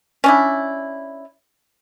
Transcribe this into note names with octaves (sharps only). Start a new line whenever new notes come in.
C#4 D4 E4